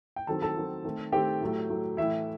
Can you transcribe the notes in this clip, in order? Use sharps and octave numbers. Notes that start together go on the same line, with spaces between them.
G5
D#3 F#3 C4 A4 A5
A4 A5
D#3 F#3 C4
D#3 A3 C4
D#3 A3 C4 G4 G5
A2 F#3 A3
A2 F#3 A3
A2 E3 A3 E4 E5